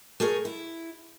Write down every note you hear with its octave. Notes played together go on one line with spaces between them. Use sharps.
A3 G#4 A#4 C#5
E4